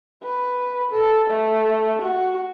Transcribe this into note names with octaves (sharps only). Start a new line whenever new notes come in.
B4
A4
A3
F#4